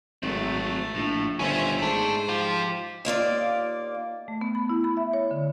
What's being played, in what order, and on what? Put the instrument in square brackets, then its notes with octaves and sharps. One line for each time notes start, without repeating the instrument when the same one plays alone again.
[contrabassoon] G#1 [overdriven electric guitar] F#3 C4 [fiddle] A3
[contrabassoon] A#1 [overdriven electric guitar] A2
[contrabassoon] G1 [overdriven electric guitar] D#3 F4 [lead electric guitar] C#4 [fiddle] C5 E5
[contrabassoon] G#2 [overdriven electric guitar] A3 [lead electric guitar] D4 [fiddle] C5
[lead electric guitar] F3 F4 [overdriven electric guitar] G4
[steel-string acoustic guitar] D#2 A#3 F4 D5
[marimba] A3
B3
B5
E4
B5
E5
C#5
D3